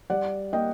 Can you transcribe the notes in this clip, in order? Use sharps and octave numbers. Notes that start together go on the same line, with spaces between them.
G3 D5 F#5
A#3 D#5 G5